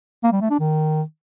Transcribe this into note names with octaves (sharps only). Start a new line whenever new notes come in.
A#3
G3
A3
D4
D#3